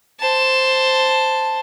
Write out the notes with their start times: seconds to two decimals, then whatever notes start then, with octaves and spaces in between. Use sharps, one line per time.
0.20 C5 A5